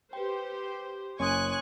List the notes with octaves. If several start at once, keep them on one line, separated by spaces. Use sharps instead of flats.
G4 B4 C5 G5
F#1 C#5 G#5 C6 C#6 D#6 F#6